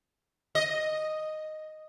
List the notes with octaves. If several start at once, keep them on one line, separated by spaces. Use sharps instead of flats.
D#5